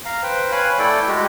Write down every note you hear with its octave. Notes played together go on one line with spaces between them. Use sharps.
F5 A#5
B4 C5 G5
B4 C#5 F5 G#5 B5
A3 E4 A4 D5 G5
G#3 F#4 G4